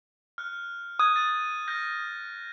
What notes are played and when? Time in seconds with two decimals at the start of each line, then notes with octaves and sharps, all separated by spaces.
0.38 F6 F#6
0.99 D#6 F#6 G#6
1.16 A6 D#7
1.68 F6 G6 A#6